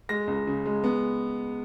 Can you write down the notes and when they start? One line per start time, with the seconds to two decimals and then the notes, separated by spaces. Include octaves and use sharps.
0.09 G#3 A#6
0.27 C#2
0.47 C#3
0.66 G#3
0.84 B3